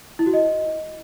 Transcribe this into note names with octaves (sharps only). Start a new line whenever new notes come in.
E4
F#4
D#5